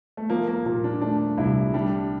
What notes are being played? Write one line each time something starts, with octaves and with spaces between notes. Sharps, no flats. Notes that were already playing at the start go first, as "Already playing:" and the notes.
A3
F3 A#3
A#3
A#2 A#3
D4
A3 D4
C2 E4
G3 D4